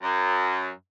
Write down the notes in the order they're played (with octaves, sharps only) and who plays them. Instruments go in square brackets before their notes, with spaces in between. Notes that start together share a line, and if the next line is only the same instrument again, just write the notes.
[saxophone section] F#2